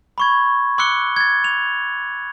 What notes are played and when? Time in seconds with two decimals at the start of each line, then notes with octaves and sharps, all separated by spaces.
0.18 B5 C#6 G#6
0.78 C6 D6 E6 F#6 C#7 G7
1.16 G#6 A6
1.44 F7